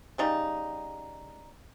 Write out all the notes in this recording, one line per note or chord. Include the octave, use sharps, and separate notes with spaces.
C#3 G3 D#4